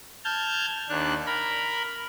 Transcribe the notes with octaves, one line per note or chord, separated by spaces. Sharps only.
A5 F6 G6 G#6
D#2 D4 F#6
A#4 B5